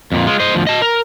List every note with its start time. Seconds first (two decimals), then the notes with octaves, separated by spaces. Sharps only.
0.12 F2 A#2
0.27 G#3 F4
0.40 C5 D#5
0.55 D2 F3
0.67 D#5 A5
0.82 A#4